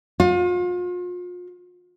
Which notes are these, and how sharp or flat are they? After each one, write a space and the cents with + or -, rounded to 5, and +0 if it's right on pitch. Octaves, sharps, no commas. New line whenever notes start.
F4 +40